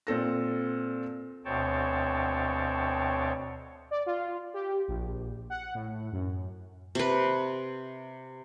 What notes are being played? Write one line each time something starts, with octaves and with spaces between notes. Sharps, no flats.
A#2 C4 A4 A#6
D2 B2 C4 C#5 G5 A5
D5
F4
G4
A#1
F#5
A2
F#2
C3 B4